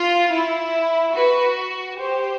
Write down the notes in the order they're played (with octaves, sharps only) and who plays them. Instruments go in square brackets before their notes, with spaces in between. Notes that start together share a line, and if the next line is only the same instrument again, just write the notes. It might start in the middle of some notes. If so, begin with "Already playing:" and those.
Already playing: [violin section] F4
E4
[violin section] F#4 [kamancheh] B4
[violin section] G4 [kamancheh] C5